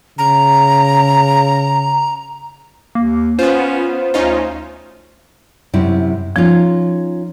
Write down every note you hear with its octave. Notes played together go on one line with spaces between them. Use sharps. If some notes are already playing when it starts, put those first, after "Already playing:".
C#3 A#5
D#2 A#3
B3 C#4 F4 C5
D2 C#4 D#4 F4
F#2 C3 E4
F3 C#4 D#4 F4